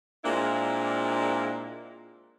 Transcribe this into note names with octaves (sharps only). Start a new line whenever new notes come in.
A#2 G#3 A#3 C4 D4 E4